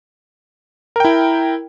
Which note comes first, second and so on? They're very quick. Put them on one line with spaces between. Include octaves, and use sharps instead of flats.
A#4 G5 E4